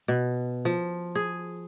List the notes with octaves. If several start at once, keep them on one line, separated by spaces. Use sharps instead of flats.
B2
F3
G#4